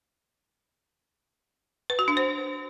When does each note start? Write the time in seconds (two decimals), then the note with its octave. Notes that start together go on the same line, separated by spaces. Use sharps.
1.90 B4
1.99 F#4
2.08 D4
2.17 C5